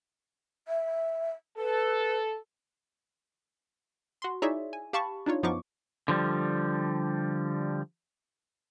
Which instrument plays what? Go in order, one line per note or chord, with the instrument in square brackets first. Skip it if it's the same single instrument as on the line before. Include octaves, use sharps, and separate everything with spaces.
[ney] E5
[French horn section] A4 [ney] B4
[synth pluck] F#4 C6
D#4 E4 G#4 C#5 D5 E5
G#5
G4 F5 A5 B5 C#6
D4 D#4 F4 C#5
F#2 F3 B3 D#4 C#6 D6
[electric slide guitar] D3 F3 G3